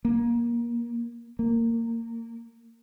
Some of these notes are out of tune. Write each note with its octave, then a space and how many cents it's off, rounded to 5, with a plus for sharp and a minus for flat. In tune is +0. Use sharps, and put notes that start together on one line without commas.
A#3 +20
A#3 -20